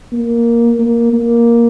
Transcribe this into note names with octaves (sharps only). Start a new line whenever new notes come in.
A#3
A#3
A#3